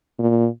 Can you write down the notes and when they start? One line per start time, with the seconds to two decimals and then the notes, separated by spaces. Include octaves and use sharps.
0.19 A#2